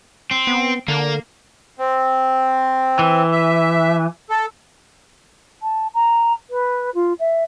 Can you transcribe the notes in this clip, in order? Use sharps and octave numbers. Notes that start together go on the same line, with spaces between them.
C4
B3
D3 A#3
C4
E3
E5
A4
A5
A#5
B4
F4
E5